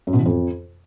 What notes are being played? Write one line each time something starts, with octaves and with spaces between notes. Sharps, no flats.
F#2
B2
E3
F2